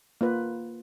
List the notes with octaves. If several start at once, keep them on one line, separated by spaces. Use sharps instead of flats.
A#3 F4 B4